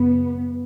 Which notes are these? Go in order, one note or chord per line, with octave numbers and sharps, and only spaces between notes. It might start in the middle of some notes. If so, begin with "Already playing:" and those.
Already playing: F#2 C#3 B3